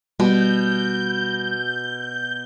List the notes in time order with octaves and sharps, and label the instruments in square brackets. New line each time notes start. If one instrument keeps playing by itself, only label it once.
[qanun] B2 [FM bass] G3 [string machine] G6